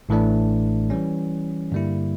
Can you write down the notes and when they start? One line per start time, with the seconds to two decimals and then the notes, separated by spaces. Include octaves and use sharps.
0.09 A1 A2 E3 A3 D4
0.90 E3 G3 C#4
1.72 G2 D3 G3 A#3 E4